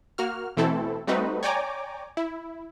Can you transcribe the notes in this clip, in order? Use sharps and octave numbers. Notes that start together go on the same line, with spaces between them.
A#3 F#4 F6
B2 E3 A3 C4 E4 A4
G3 A3 C4 D#4 F#4 B4
C#5 D5 G5 G#5 A#5 D6
E4